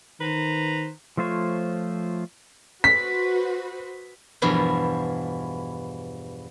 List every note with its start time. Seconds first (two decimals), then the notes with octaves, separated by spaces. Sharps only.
0.20 D#3 B4 C5 A#5
1.17 F3 A3 F4 C5 C#5
2.84 F#4 B4 C5 B6
4.42 E2 G2 B2 F3 E4